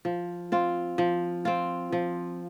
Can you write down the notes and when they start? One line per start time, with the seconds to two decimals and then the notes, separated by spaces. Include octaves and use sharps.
0.05 F3
0.52 C4 F4
0.98 F3
1.45 C4 F4
1.92 F3